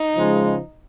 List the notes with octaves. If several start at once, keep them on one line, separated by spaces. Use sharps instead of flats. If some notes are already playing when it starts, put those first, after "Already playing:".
Already playing: D#4
C#3 F3 G#3